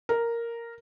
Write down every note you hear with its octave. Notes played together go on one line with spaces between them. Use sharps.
A#4